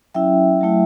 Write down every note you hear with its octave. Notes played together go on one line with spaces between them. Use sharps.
F#3 C#4 E4 E5 G5
F#3 A3 E4